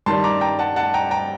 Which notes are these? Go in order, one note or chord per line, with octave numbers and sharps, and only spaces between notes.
G2 D#3 G3 A5 C6
A#5 D6
G5 A#5
F#5 A5
F#5 A5
G5 A#5
G5 A#5